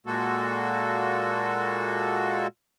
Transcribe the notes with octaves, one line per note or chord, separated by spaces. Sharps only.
A#2 G#3 A#3 F#4 A4